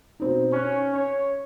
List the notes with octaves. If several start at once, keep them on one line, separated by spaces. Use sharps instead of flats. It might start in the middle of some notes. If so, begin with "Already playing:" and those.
B2 C4 D#4
C#4 C#6 F#6
C#5